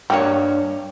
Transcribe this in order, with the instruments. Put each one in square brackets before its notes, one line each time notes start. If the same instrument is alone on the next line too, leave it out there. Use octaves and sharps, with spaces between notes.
[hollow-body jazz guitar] G2 C#5 [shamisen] A#3 G4